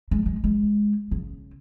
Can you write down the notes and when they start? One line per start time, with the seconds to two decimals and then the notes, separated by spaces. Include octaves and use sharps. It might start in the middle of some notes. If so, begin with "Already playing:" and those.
0.11 G#3
0.26 G#3
0.44 G#3
1.11 C#3